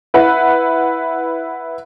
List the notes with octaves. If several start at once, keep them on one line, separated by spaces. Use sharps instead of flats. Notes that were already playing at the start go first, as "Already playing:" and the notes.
E4 B4 F#5